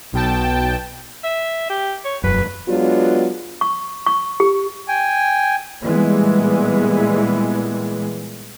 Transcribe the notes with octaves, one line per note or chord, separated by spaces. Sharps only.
B1 B2 G5 A5
E5
G4
C#5
E1 F#2 B4
F#3 G#3 B3 D4 F4
C#6
C#6
G4
G5 G#5
A#2 E3 G3 G#3 B3